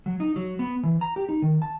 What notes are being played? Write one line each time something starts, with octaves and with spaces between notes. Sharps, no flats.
F#3
D#4
F#3
B3
E3
A#5
G4
D#4
D#3
A5